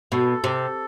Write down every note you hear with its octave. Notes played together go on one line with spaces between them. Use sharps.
B2 A4
C3